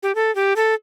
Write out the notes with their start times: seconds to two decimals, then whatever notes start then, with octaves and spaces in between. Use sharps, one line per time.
0.03 G4
0.15 A4
0.35 G4
0.56 A4